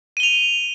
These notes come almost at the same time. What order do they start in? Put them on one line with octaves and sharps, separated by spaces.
D#7 G7 F7